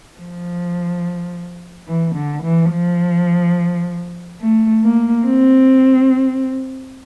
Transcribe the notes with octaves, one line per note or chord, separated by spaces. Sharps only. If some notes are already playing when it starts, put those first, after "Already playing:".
F3
E3
D3
E3
F3
A3
A#3
C4